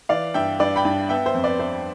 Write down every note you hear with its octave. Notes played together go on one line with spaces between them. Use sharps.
E3 D5 F5
G2 E5 G5
G2 B4 D5
G5 B5
G2
B3 E5 G5
C5 E5
F2
B4 D5
B3 C5 E5